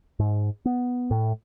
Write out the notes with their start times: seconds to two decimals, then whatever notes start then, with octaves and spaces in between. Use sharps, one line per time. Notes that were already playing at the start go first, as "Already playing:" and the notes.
0.19 G#2
0.65 B3
1.11 A2